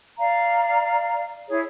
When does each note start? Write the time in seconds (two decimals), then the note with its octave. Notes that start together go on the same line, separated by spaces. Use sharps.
0.19 D5 F5 A#5
1.49 E4 G#4 C#5